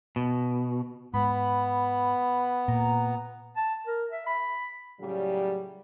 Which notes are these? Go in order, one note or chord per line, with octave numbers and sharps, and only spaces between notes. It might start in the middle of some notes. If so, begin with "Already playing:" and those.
B2
G#2 B3 B5
A#2 A#5
A5
A#4
E5
B5
A2 C#3 F#3 G3